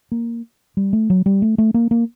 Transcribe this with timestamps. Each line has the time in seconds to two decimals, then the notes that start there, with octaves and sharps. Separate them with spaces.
0.12 A#3
0.77 G3
0.93 A3
1.10 F#3
1.26 G3
1.42 A3
1.58 A3
1.74 A#3
1.91 A#3